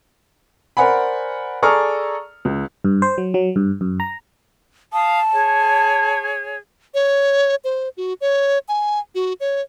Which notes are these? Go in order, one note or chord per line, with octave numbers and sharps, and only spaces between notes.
A#4 C5 D5 F#5 G#5 B5
G#4 A4 D5 A#5 C#6 F6
C#2
G2
C5
F#3
F#3
G2
F#2
A#5
F5 A5 D#6
G#4 C#5
C#5
C5
F#4
C#5
G#5
F#4
C#5